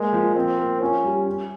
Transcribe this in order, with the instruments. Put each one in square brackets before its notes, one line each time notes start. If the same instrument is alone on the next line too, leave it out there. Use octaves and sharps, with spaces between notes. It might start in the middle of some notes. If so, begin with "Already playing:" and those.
Already playing: [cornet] G#3 [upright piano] A#3
[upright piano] F3
[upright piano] A#3 [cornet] C4
[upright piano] A#3
[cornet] C#4 [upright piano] F4
[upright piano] G3
C#4